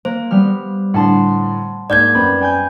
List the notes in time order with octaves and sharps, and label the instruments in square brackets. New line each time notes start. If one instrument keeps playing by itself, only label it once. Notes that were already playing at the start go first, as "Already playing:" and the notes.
[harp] A#3 [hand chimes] C5
[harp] G3 B3 F6
[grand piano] A2 D3 [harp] F#5 A5 C6
[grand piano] G#2 A#3 G6 [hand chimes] D5 G#6
[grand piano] F#2 B3 C4 [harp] B5
[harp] G5 G#5 G6